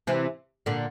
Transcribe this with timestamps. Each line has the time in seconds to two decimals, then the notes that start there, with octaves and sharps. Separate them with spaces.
0.07 C3 E3
0.66 A#2 D3